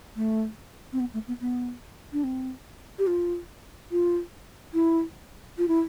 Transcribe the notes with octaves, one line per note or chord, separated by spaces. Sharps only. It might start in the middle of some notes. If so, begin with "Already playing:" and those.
A3
C4
B3
A3
B3
B3
D4
C4
G4
F4
F4
E4
F4
E4